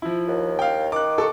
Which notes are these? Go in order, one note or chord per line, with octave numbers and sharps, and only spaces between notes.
F3 E4
D#2
F5 G5
D#3 D6 F#6
A4 C#6